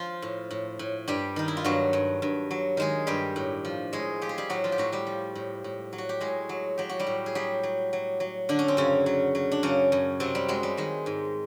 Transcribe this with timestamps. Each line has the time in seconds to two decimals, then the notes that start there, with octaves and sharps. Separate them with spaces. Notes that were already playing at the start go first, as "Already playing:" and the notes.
Already playing: F3 F4
0.22 A2
0.51 A2
0.79 A2
1.08 G2 G3 G4
1.36 D#3 D#4
1.48 E4
1.57 F4
1.64 G2 F#3 F#4
1.93 G2
2.22 G2
2.51 F#3
2.77 D#3 G#3 G#4
3.07 G2 G3 G4
3.36 A2
3.65 F3
3.93 A2 G#3 G#4
4.22 F3 G4
4.29 G#4
4.38 G3 G4
4.50 A2 F#3 F#4
4.64 F3 F4
4.72 G4
4.78 A2 F#3 F#4
4.92 G3 G4
5.07 F3
5.35 A2
5.64 A2
5.93 F#3
5.98 F#4
6.09 G4
6.20 A2 G#3 G#4
6.49 F#3
6.78 F#3 G4
6.89 F#4
6.99 G3 G4
7.07 A2
7.26 G#4
7.35 F#3 G3 G4
7.63 F#3
7.93 F#3
8.20 F#3
8.49 D3 D4
8.59 C#4
8.68 C4
8.77 F#2 C#3 C#4
9.06 F#3
9.35 F#3
9.52 D4
9.63 F#2 C#3 C#4
9.92 F#2
10.20 C3 F#3 C4
10.35 G3
10.48 F#3 G#3
10.63 G3
10.77 D#3 G#3
11.06 G#2